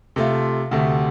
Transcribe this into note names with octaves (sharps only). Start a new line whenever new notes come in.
C3 A3 F4
D2 C3 A3